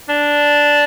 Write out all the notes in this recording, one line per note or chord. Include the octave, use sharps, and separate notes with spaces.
D4